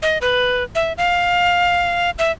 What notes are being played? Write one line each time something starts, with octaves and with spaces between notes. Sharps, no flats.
D#5
B4
E5
F5
E5